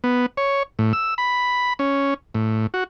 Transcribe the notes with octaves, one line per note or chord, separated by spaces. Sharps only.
B3
C#5
A2
E6
B5
C#4
A2
F#4